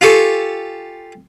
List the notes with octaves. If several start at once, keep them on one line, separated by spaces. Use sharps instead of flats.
F4 G4 A4 G#5 C#6